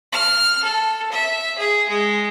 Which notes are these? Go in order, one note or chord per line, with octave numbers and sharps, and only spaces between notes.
F6
A4
E5
G#4
G#3